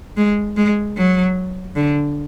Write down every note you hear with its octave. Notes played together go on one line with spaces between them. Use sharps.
G#3
G#3
F#3
D3